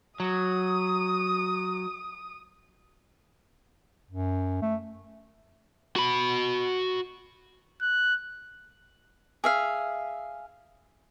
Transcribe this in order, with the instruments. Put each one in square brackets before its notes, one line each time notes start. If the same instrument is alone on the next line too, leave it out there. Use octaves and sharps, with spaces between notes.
[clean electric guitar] F#3 [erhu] D#6
[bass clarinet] F#2
A3
[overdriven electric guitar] F#4 B5
[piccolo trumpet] F#6
[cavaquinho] G#4 E5 F5